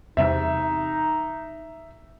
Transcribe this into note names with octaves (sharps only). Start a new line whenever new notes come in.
E2 C3 G3 D#4 E5